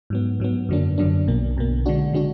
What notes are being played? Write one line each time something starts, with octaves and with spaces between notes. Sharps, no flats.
G#2 F#3 B3
G#2 F#3 B3
F#2 D3 F#3 A#3 D4
F#2 D3 F#3 A#3 D4
B1 B2 A#3
B1 B2 A#3
D3 G#3 D4 F#4
D3 G#3 D4 F#4